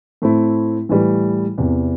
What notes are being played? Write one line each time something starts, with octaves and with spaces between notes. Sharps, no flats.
A2 A3 C4 E4
A2 E3 G3
E2 C3 E3